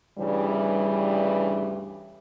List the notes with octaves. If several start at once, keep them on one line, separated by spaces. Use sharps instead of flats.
D2 G2 C#3 E3 G3